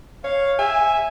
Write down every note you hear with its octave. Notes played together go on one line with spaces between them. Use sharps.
C#5 F5
E5 G#5